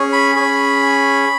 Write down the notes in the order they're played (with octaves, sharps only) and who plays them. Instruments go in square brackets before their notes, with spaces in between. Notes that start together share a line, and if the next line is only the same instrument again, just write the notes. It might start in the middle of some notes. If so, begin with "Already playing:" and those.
Already playing: [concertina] C#4 G#4
B5
C#4 G#4